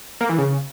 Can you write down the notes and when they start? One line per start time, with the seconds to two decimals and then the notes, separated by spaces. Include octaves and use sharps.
0.21 A#3
0.29 E3
0.38 C#3